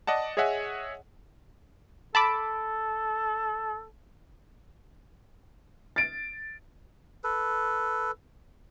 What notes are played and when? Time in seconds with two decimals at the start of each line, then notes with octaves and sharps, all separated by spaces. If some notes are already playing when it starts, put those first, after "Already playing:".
0.07 D5 D#5 F#5 A5
0.37 G#4 C#5 D#5 E5 F#5 G#5
2.15 A4 A5 B5 D6
5.96 A6 D7
7.24 A4 B4